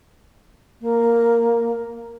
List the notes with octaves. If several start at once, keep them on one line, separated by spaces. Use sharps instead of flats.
A#3